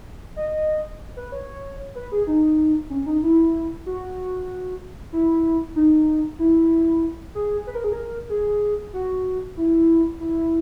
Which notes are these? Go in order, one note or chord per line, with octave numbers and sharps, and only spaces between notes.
D#5
B4
C#5
B4
G#4
D#4
C#4
D#4
E4
F#4
E4
D#4
E4
G#4
B4
A#4
G#4
A#4
G#4
F#4
E4
E4